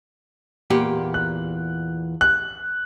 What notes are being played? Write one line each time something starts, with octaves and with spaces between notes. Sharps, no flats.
E2 A#2 G4
F#6
F#6